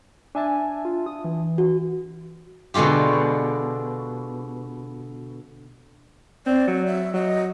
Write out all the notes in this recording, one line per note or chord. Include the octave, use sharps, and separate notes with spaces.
D4 E5 G#5 A5
F4
D#6
E3
F#4
B2 D3 G#3 F4 G4
C4 D5
F#3
E5
F#3 D#5